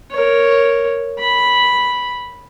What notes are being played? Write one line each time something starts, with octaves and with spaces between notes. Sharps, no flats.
A#4 C#5
B5